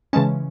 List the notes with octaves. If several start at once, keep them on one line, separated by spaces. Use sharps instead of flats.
C#3 E3 G#3 C#4 A5